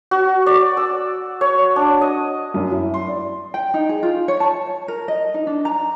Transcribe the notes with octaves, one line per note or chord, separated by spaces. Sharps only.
F#4
D5
E6
C#5
D4
D#5
F#2
E4
C6
D5
G5
D#4
G#4
F4
C#5
A5
A#4
D#5
D#4
D4
A#5